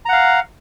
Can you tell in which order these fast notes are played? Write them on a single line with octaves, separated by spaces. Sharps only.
A#5 F#5 F5